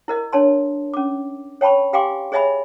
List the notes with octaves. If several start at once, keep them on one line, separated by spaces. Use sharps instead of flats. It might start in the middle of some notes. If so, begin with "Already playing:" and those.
E4 A#4 D#5
D4 C#5 A5 C6
C#4 D6
C#5 G5 A5 B5 C#6
G4 F5 G5 G#5 C6 D6
G#4 C#5 D#5 E5 G#5 B5